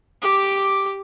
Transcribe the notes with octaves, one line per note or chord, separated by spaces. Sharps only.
G4 D6